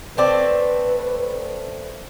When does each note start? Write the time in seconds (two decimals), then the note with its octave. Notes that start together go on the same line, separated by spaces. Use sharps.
0.17 A3 C4 B4 D5